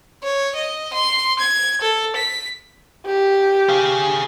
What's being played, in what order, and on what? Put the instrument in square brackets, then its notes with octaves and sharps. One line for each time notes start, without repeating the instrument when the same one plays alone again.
[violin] C#5
D#5
C6
G#6
A4
B6
[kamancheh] G4
[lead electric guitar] G#4 F5